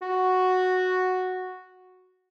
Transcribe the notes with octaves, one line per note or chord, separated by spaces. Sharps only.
F#4